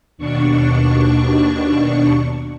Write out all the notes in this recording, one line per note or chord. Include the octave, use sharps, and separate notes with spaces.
D#2 B2 D4 C#6